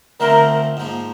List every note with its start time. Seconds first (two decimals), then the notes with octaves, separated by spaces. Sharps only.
0.20 D3 F3 A3 C4 A#4
0.77 G#2 F3 A#3